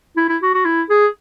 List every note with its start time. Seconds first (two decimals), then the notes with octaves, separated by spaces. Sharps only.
0.17 E4
0.29 E4
0.42 F#4
0.54 F#4
0.65 E4
0.90 G#4